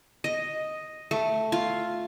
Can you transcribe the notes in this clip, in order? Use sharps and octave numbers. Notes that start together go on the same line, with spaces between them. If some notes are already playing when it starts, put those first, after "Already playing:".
D#5
A3
F4